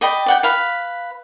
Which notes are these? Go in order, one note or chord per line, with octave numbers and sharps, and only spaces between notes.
D5 D#5 G5 B5
D5 F#5 G5
B4 F5 B5